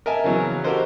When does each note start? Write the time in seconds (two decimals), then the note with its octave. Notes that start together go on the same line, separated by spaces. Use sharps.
0.06 A#4 D#5 E5 G#5 A5
0.24 C#3 E3 F#3 B3
0.64 F#4 G4 A4 A#4 C5 D#5